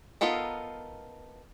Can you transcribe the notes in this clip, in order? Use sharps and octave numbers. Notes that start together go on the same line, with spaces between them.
B3 D#4 F4 A4 A#4